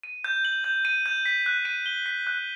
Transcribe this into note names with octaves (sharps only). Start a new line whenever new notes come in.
D#7
G6
F#7
G6
D#7
G6
B6
F#6
D#7
G7
B6
F#6